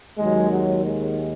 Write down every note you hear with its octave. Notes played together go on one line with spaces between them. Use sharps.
D#2 D#3 F#3 G#3
F#3
G#3